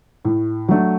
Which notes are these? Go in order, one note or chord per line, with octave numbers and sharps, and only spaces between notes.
A2
F#3 A3 D4